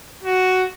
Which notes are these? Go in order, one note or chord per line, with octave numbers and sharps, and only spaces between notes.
F#4